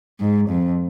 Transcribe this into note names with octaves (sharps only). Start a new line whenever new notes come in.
G#2
F2